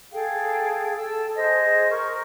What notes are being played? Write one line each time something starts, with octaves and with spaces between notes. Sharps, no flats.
G#4 A4 F5 G5
A4 A5 E6
G#4 C5 D#5
A#4 C#6